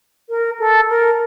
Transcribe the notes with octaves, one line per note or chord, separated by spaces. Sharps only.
A#4
A4
A#4